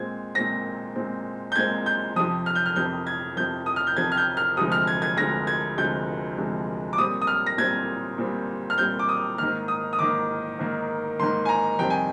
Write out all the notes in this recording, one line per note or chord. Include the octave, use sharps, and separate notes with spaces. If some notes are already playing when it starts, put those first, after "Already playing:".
Already playing: A#2 G#3 C4 G#6
A#2 G#3 C4 A#6
A#2 G#3 C4
G6
A#2 G#3 C4 G#6
G6
F2 C3 F3 D#6
F6
G6
F6
F2 C3 F3 G6
G#6
F2 C3 F3 G6
D#6
F6
G6
F2 C3 F3 G#6
F6
G6
F6
D2 C3 F3 G#3 D#6
F6
G#6
G#6
D2 C3 F3 G#3 A#6
G#6
D2 C3 F3 G#3 G6
D2 C3 F3 G#3
D6
A#2 G3 C4 D#6
D#6
F6
A#6
A#2 G3 C4 G#6
A#2 G3 C4
F6
A#2 G3 C4 G6
D6
D#6
G#2 D#3 A#3 F6
D#6
D#6
G#2 D#3 A#3 D6
G#2 D#3 A#3
G#2 D#3 A#3 C6
G#5
A#5
F2 C3 D#3 G3 C4 G5
G#5